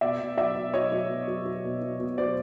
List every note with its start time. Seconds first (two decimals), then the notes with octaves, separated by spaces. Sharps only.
0.01 B2 D5 E5
0.20 B2
0.37 F#3 D5 E5
0.56 B2
0.74 F#3 C#5 D#5
0.92 F#3
1.10 B2
1.28 F#3
1.45 F#3
1.64 B2
1.82 F#3
2.00 B2
2.17 F#3 C5 D5